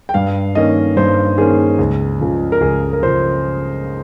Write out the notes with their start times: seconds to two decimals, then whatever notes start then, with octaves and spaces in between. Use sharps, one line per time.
0.09 G5
0.14 G2 F5
0.55 D#3 A#3 C#4 D#5
0.97 G2 C5
1.38 D#3 A#3 C#4 G#4
1.78 C#2
2.20 C#3 F3
2.52 A#4
2.61 C#2 G#4
2.93 A#4
3.03 C#3 F3 C5